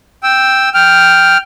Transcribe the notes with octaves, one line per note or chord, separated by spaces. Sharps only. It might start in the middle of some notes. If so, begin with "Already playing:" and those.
G5 E6
G5 F6